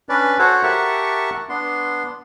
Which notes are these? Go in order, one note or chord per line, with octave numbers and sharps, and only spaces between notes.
C#4 D4 B4 D5
F#4 A4 C5 C#5 F#5
G4 A#4 E5 F#5 A5 C#6
B3 D4 C6